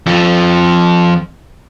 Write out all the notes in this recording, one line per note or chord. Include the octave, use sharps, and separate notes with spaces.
F2 F3